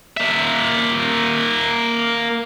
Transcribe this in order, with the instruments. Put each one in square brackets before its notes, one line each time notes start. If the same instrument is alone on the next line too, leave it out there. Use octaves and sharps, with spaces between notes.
[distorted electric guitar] A#3 E5